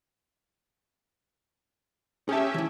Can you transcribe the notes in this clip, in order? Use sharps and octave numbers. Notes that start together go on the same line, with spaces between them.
C#4 G4 G#4 E5 A5
E3 E4